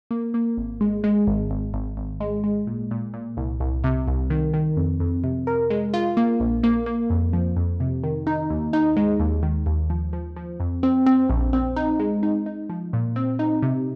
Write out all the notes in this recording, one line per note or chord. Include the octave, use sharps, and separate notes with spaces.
A#3
A#3
G#1
G#3
G#3
G#1
G#1
G#1
G#1
G#3
G#3
A#2
A#2
A#2
C2
C2
C3
C2
D#3
D#3
F2
F2
C3
A#4
G#3
F4
A#3
A#1
A#3
A#3
F2
F3
F2
C3
D#3
D#4
D#2
D#4
G#3
D#2
D#3
D#2
F3
F3
F3
F2
C4
C4
A#1
C4
D#4
G#3
D#4
D#4
F3
A#2
C4
D#4
C3